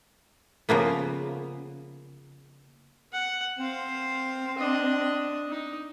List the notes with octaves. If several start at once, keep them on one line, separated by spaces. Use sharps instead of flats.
C#3 F3 A#3 B3
F#5
C4 C5 F5
D4 D#5
D#4